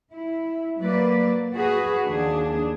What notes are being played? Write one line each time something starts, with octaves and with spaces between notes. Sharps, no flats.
E4
F#3 A#3 B4 D5
F#4 G#4 B4
D#2 D4 G#4